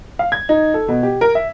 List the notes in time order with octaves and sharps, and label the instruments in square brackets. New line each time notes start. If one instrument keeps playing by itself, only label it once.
[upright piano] F5
G#6
D#4
A4
B2
G4
A#4
E5